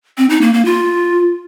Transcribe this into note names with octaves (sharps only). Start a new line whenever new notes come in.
C4
D#4
A#3
A#3
F4